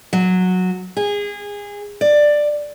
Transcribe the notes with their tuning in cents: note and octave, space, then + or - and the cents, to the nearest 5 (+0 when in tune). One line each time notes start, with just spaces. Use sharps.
F#3 -10
G#4 -25
D5 +10